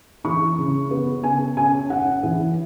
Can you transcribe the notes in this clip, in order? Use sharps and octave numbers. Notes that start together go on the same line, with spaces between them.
E3 C#6
C#3
B3
C#3 G#5
C#4 G#5
C#4 F#5
E3